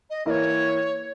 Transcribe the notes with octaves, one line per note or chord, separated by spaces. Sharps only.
D#5
E3 A#3 E4 C#5 D#5